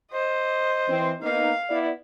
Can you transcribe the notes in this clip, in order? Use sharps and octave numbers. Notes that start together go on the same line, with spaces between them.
C5 D#5
E3 C4
A#3 B3 D#4 F5
B3 E4 D5